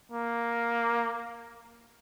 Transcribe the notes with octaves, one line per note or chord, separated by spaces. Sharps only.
A#3